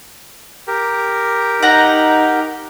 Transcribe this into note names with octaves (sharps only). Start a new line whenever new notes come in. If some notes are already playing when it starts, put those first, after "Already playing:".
G4 A#4
D#4 F#5 A#5